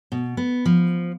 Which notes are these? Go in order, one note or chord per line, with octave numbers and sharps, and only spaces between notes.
B2
B3
F3